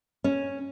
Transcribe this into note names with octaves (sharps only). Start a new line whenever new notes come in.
C#4